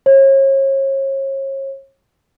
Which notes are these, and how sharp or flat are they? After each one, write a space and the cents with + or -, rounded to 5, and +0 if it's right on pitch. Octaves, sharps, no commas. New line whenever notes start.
C#5 -35